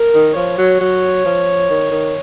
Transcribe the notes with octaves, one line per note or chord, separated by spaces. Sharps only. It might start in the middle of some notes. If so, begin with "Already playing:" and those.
Already playing: A#4
D#3
F3 C#5
F#3
F#3
F3
D#3
D#3